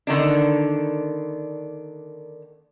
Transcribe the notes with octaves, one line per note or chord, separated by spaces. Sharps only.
D3 D#3 A#3 D4